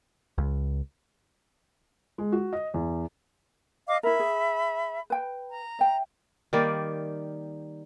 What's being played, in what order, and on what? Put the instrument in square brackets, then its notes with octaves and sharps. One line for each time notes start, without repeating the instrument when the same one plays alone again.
[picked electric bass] C#2
[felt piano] G#3
F#4
D#5
E2
[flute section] D#5 F5 D6
[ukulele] E4 A#4 [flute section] E5 B5
[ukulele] G#4
B4 G5
[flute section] A#5
[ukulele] E5 G5
[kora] D#3 G3 A#3 D5